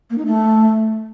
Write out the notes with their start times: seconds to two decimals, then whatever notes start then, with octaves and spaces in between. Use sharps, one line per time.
0.10 A#3
0.18 D#4
0.26 A3